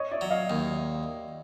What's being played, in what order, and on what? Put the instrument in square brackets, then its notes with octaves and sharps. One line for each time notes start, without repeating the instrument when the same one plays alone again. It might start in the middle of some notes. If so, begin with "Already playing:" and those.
Already playing: [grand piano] C#5 D#5
D5 E5
[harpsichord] F#3
[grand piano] D#5 F5
[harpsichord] D#2